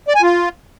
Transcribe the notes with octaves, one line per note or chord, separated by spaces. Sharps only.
D5
G#5
F4